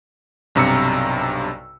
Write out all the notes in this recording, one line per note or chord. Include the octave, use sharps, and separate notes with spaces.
B1 G2 C3 A#5 E6 C#7